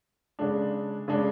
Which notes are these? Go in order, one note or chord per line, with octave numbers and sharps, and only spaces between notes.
C#3 G#3 D4
C#3 G#3 D4